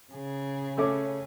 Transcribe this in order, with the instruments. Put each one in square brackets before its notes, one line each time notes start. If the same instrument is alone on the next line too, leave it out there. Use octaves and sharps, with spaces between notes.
[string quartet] C#3 G#4
[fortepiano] A3 C#4 D6